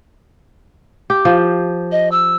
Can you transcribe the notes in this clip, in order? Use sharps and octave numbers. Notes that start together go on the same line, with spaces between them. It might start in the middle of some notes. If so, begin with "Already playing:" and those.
G4
F3
D#5
E6